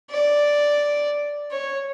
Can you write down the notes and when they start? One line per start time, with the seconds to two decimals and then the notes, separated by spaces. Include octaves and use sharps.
0.10 D5
1.51 C#5